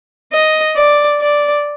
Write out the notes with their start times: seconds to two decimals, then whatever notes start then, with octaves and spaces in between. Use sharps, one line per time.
0.33 D#5
0.76 D5
1.21 D5